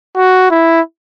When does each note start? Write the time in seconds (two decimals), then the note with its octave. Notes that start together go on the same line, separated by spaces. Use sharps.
0.17 F#4
0.50 E4